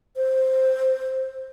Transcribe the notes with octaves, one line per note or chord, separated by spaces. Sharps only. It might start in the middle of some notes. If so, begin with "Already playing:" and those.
C5